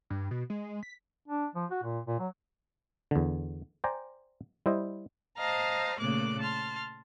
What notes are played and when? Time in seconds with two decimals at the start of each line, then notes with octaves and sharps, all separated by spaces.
0.10 G2
0.31 B2
0.50 G#3
0.83 B6
1.28 D4
1.55 F3
1.70 F#4
1.83 A#2
2.07 A#2
2.19 F#3
3.11 E2 D3
3.84 C5 D5 G5 G#5 A#5
4.66 G3 E4 C5 D#5
5.37 C5 D#5 F5 A5 A#5
6.00 A#2 C#3 A3 A#3 D6 F#6
6.40 A5 C6 F6